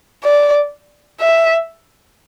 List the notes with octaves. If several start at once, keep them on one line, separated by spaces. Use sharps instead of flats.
D5
E5